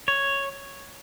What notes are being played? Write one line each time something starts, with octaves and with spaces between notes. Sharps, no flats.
C#5